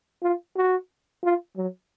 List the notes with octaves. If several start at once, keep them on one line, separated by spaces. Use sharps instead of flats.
F4
F#4
F4
F#3